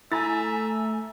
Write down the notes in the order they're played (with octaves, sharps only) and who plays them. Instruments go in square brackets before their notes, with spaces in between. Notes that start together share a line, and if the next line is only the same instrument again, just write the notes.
[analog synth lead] A3 [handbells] E4 [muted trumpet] E5 [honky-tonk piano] G#5 A#5 A6